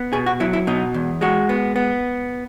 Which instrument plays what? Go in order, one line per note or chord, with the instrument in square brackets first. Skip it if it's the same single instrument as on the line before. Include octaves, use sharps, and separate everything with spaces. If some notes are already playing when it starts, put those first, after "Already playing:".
Already playing: [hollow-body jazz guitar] B3
B2 G#4
F#4
F#3 E4
E4
B2 D#4
E2
G#3 F#4
B3
B3